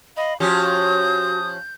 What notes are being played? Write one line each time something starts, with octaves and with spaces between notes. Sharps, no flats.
D#5 F5 B5
F3 C#4 F#4 G4 D#6 G6